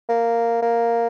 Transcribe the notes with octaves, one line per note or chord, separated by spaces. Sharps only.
A#3
A#3